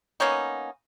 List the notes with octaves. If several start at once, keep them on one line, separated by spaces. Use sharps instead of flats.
A#3 B3 C#4 D#4